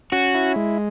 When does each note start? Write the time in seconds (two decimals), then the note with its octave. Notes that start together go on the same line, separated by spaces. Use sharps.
0.12 C#4 F#4
0.34 E4
0.56 G#3